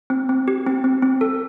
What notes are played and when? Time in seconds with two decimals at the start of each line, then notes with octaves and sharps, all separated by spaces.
0.10 C4
0.29 C4
0.48 G4
0.67 C4
0.84 C4
1.02 C4
1.21 A4